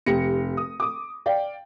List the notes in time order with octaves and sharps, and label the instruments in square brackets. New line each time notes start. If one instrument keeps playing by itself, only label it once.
[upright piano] F1 G4 A#6 C#7
D#6
D6 D#6
D5 F5 G5